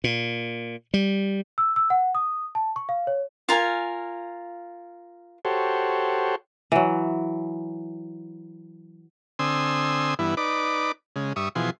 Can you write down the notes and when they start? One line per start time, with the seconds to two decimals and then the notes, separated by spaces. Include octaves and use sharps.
0.04 A#2
0.94 G3
1.58 E6
1.76 E6
1.90 F#5
2.15 D#6
2.55 A5
2.76 C#6
2.89 F5
3.07 C#5
3.49 F4 A#4 G#5
5.45 F#4 G4 A4 C5 C#5
6.72 E3 F#3
9.39 D3 C4 G#5 C6 D#6 E6
10.19 G2 E3 B3 E4
10.37 D#4 B4 D5 D6
11.16 C#3 G#3
11.36 G2 E5 C#6 D#6
11.55 B2 E3 F3 G#4 C6